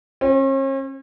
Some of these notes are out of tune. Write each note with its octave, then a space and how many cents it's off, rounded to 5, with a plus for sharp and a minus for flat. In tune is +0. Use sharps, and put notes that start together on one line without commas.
C#4 -45